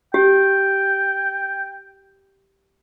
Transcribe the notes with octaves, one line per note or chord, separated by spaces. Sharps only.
G4 G5